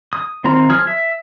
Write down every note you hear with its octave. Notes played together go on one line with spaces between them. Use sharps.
D#6
D#3 C4 F4 A#5
F3 G#4 D#6 F6
E5